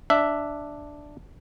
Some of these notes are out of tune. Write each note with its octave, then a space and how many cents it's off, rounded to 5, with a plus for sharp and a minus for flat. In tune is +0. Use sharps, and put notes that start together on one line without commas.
D4 +0 E5 +0